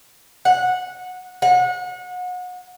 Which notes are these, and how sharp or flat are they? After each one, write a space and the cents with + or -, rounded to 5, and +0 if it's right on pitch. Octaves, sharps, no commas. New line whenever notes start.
F#5 -15
F#5 -30